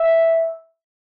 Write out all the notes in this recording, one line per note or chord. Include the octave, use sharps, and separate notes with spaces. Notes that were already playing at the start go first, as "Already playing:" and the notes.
Already playing: E5